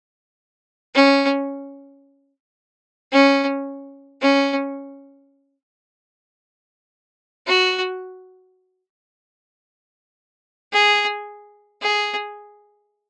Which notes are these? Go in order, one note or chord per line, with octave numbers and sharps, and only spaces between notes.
C#4
C#4
C#4
F#4
G#4
G#4